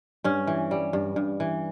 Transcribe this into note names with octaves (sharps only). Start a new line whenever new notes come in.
G2 C#4
E3
G3
G2
G2
E3